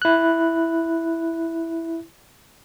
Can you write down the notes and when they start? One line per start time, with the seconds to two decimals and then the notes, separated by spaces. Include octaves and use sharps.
0.02 E4 F#6